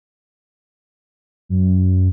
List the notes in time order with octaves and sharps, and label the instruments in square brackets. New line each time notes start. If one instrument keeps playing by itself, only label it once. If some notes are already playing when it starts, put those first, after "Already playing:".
[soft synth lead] F#2